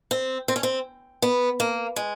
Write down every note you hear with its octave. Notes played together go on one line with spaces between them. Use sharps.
C4
C4
C#4
C4
B3
A#3
G#3